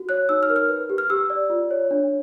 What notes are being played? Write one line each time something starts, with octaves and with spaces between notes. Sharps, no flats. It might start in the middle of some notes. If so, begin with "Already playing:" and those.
Already playing: F#4
C#5 F#6
D#4 E6
F6
A#4
F6
B4
G4
F6
G4 E6
D5
F4
C#5
D4